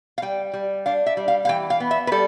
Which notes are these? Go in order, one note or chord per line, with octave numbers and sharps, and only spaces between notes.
F5
G3 G5
G3
D4 F5
E5
G3
F5
F5
E3 G5
F5
B3
E5
B4
G3 A4